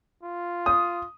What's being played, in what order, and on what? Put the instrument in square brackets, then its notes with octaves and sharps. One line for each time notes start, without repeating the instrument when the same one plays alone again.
[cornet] F4
[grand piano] D#6